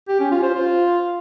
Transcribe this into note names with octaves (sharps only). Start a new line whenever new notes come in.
G4
C#4
F4
C5
F4